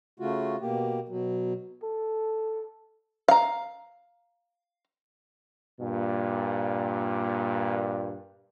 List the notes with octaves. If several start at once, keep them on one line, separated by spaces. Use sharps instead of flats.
C#3 A3 F4 F#4
B2 A#3 G4
B2 F#3
A4
F5 A#5
G2 A#2